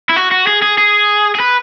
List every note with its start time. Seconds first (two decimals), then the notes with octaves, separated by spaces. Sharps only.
0.10 E4
0.17 F#4
0.31 F#4
0.47 G#4
0.62 G#4
0.78 G#4
1.35 G#4
1.40 B4